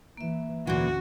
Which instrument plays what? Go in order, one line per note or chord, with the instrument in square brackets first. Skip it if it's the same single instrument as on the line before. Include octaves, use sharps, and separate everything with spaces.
[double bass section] E3 [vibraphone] A#3 E5
[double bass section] D2 C#4 [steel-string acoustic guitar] A#2 E3 [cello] F#4